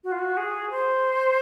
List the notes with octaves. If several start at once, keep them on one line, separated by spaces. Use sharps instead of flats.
F#4
F4
F#4
G#4
C5